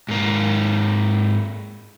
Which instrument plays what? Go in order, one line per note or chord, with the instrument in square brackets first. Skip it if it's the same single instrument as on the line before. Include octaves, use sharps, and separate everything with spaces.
[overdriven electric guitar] G#2 A#3